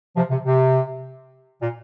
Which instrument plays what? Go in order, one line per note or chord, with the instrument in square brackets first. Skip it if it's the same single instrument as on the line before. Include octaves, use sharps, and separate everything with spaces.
[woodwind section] C3 F3
C3
C3
A#2